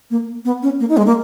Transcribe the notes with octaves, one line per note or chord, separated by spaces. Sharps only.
A#3
B3
C#4
A#3
D#4
G#3
A#3